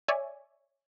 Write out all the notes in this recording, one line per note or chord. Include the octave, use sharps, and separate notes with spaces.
C#5 D5 E5 G#5